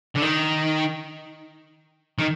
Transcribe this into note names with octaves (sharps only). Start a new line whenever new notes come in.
D3
D#3
D#3